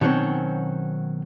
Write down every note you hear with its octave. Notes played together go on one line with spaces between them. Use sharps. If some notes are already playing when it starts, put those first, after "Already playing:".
B2 D#3 F#3 A#3 C4 C#4